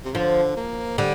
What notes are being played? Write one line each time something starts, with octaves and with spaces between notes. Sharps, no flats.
C3
D3 F3
A#3
D3 G3